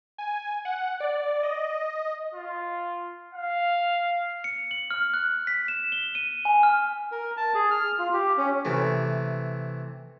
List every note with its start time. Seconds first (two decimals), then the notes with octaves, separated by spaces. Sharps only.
0.18 G#5
0.65 F#5
1.00 D5
1.43 D#5
2.34 F4
3.34 F5
4.44 C#7
4.71 F#7
4.91 F6
5.14 F#6
5.47 B6
5.68 E7
5.92 G7
6.15 D#7
6.45 G#5
6.63 F6
7.12 A#4
7.37 A5
7.55 G#4
7.71 F6
7.99 F4
8.13 G4
8.37 C#4
8.65 C3 E3 A3